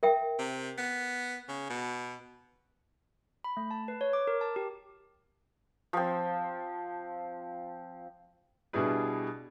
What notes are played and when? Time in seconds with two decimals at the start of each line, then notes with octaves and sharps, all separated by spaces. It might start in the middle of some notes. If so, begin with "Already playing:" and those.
0.03 A#4 E5 G5
0.39 C3
0.78 B3
1.48 C#3
1.70 B2
3.44 B5
3.57 A3
3.71 A5
3.88 B4
4.01 C#5
4.13 D6
4.27 A#4
4.41 A5
4.56 G4
5.93 F3 C4
8.73 B2 G3 D4 E4 G#4 B4